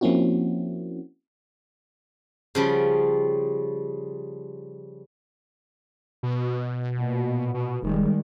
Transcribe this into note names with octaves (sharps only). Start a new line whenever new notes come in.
F3 A#3 C4 C#4 E4 F#4
C#3 F3 G3
B2
A#2
B2
F1 D#3 G3 G#3